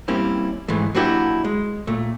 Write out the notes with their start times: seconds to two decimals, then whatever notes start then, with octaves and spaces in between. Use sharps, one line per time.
0.08 G3 A#3 C4 C#4 E4
0.68 G#2 E3 G#3 A3
0.95 F#3 A#3 D4 E4 F#4 G4
1.44 G#3
1.87 A#2 A3